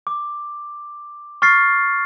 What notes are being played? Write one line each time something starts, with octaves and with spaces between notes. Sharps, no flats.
D6
C#6 F6 A6 C7